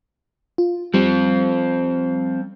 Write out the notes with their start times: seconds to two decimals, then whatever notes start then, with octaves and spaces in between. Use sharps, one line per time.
0.58 F4
0.94 F3 G3 C4